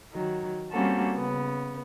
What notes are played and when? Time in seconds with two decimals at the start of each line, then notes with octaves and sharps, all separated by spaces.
0.13 D#3 F#3
0.70 G3 A#3 C4 C#4 F#4 A4
1.15 C#3 B3